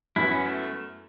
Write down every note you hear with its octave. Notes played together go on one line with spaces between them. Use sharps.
F#2 E3 B3 E4
C#4
A3